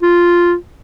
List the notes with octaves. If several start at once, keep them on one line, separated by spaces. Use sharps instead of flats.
F4